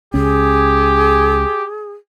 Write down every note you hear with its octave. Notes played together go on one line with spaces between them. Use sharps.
C#2 C#4 G4 G#4